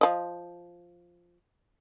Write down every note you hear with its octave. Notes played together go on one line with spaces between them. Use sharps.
F3 D#5